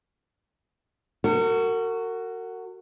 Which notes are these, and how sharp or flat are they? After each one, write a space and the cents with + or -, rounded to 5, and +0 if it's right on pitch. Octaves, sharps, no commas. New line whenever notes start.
F#4 +5 A#4 -40